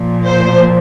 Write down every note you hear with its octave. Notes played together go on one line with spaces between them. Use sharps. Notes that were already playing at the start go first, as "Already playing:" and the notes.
Already playing: A#2 F3
C5